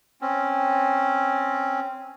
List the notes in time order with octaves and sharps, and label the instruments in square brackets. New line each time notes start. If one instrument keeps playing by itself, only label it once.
[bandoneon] C4 C#4